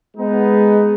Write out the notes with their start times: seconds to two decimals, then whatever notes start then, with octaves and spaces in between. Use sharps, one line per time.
0.17 G#3 B3 D#4